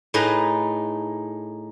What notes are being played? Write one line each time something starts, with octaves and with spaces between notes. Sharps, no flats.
A2 D#4 G#4 B4 A#5